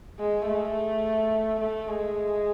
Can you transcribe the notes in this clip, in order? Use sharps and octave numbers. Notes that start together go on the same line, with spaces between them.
G#3
A3
A3
G#3